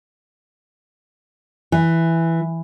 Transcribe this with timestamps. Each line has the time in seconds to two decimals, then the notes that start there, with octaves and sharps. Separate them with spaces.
1.72 E3